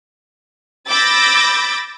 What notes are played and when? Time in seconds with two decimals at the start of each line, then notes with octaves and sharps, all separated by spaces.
0.90 B5 D6 E6 G6 A6 A#6